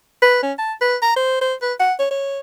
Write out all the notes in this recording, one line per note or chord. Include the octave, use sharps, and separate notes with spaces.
B4
C#4
A5
B4
A#5
C5
C5
B4
F#5
C#5
C#5